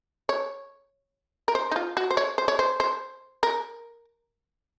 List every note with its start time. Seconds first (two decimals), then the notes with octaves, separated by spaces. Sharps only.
0.29 C#5
1.48 A#4
1.55 C5
1.71 D#4
1.76 F4
1.97 F#4
2.10 C5
2.17 C#5
2.38 C5
2.48 C#5
2.59 C5
2.80 C5
3.43 A#4